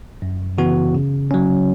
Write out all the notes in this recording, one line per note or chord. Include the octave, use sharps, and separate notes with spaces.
F#2
C#3 E3 B3 F#4
C#3
F#3 C#4